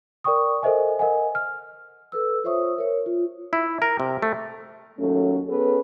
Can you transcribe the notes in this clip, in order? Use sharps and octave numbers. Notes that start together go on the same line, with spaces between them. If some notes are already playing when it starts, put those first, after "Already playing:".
A#4 D5 G5 C#6 D#6
A4 A#4 C5 D#5 E5 G#5
A#4 D#5 F#5 G#5
F6
A4 B4 E6
F4 C5 C#5 E5 C#6 D#6
A#4 C#5
F4
E4
A#4
C3
A3
D#2 F#3 A3 C#4 A4
B3 C#4 G#4 A4 B4